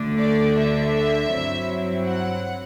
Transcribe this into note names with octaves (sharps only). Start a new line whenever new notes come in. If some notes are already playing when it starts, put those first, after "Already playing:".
Already playing: D2 D3 A3 D4
D5
E5
G2 F#3 C4 E4
F#5